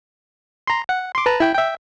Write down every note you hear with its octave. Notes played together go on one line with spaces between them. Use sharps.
A#5 C6
F#5
C6 D6
B4 A5 A#5
E4 G5
E5 G5